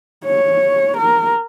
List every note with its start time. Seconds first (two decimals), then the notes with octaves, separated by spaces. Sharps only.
0.25 C#5
0.97 A#4